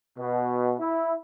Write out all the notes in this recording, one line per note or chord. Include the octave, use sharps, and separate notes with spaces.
B2
E4